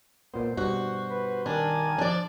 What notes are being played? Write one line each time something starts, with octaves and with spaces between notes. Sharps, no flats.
A#2 B3 C5
G2 B2 F#4
B4
D#3 D4 A#4 G#5
F3 D4 D5